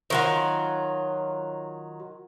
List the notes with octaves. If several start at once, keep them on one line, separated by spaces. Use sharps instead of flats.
D#3 F#3 F4